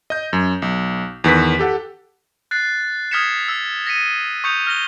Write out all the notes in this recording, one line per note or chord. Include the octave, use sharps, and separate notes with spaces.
D#5 G6
F#2
B1
E2 D#3 B4 B6
G4 A4 F#5
F#6 A6 C7
D#6 F6 G#6 B6 C#7 E7
E6
A#6 B6 C#7 D#7
C#6 D#6 G6 C#7 F7
F6 A#6 G7